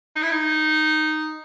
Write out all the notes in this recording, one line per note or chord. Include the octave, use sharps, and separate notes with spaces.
D#4
E4
D#4